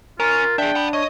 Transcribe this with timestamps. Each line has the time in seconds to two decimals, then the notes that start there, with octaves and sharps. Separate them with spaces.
0.20 C#4 F4 A#4
0.58 D4 G#4 E5 G5
0.75 F#5 B5
0.93 C#5 D#5